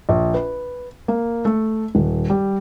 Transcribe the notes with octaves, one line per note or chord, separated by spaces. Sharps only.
A#1
B4
A#3
A3
D#1
G3